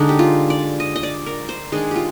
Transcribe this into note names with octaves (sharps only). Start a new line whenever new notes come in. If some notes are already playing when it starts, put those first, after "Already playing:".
Already playing: D3 G#3 D4 D#4
G4
F4
D5
D#5
D#5
D5
A#4
C5
D#3 G#3 D4 G#4
F4 G4